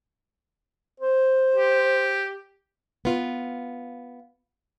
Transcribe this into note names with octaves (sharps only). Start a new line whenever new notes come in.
C5
G4
B3 F4